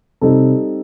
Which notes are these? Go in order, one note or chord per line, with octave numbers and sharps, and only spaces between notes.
C3 G3 C4 D#4 A4